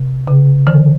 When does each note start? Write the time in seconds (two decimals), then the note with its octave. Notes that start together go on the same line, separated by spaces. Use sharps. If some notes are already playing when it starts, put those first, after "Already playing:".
Already playing: C3
0.27 C#3
0.67 D3 E3